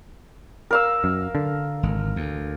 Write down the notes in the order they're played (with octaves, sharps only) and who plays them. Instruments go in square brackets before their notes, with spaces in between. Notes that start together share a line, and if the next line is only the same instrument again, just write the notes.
[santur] A#4 F5 E6
[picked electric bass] F#2
D3
[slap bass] G#1
D2